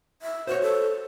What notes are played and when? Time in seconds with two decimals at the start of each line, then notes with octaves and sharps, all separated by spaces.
0.22 E5
0.47 F#4 C5 C#5
0.62 A4